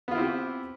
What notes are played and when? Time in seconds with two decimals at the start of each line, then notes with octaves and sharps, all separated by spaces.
0.08 B3
0.11 F4
0.15 E4
0.18 C4
0.21 G4